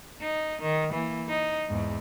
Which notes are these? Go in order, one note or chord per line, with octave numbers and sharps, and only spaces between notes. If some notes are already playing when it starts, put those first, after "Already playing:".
D#4
D#3
E3 A#3
D#4
E2 G#2